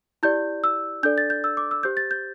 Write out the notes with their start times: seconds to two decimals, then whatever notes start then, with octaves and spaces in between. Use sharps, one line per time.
0.23 E4 G4 D5 G6
0.64 E6
1.03 D4 A4 D5 G6
1.18 A6
1.30 G6
1.44 E6
1.57 D6
1.71 E6
1.83 G4 C5 G6
1.97 A6
2.11 G6